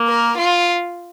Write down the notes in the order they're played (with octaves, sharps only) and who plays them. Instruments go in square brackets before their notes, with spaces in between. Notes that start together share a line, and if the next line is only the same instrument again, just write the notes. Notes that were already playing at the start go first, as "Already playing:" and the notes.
Already playing: [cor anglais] A#3
[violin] A#4
F4